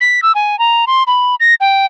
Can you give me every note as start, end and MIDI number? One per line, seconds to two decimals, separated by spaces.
0.01 0.20 95
0.23 0.32 88
0.35 0.58 80
0.59 0.85 82
0.87 1.03 84
1.07 1.35 83
1.40 1.54 94
1.61 1.86 79